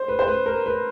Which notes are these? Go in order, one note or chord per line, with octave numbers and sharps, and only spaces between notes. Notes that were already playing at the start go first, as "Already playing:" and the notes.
Already playing: C5
B4
C5
B4
A#4
B4